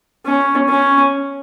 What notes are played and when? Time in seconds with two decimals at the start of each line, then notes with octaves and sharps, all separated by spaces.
0.26 C#4
0.70 C#4